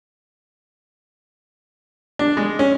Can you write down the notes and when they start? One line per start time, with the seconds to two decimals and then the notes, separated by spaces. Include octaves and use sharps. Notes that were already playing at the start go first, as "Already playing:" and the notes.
2.19 D4
2.37 G#3
2.59 C#4